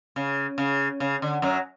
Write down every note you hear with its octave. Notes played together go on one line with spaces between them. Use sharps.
C#3
C#3
C#3
D3
F#2 F#3